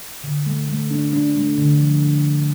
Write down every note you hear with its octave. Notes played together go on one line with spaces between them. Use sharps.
D3
A3
A3
D4
D4
A3
D3
F3